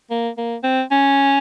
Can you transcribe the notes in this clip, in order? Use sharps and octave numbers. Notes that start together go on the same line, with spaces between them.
A#3
A#3
C4
C#4